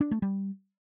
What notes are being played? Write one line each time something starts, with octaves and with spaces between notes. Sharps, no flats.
D4
A3
G3